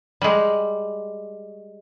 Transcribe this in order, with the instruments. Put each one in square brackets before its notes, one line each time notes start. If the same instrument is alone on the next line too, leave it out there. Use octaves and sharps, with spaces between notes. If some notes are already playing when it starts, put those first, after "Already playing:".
[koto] G3 G#3